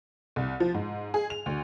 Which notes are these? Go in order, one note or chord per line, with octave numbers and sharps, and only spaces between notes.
C2
F3
G#2
G#4
F7
D2